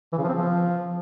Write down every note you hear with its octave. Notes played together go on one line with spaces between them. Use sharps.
E3
C#3
F3
C4
F3